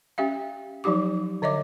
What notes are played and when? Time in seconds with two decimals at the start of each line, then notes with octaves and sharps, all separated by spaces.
0.18 C#4 G4 E5 F5
0.84 F3 F#3 D#4 G4 D6
1.42 D3 C#5 D#5 E5 D6